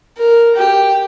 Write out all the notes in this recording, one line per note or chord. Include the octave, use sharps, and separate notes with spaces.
A#4
G4